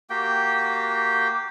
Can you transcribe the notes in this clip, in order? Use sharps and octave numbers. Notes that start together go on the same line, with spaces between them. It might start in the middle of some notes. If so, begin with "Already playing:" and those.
A#3 F#4 G4 G5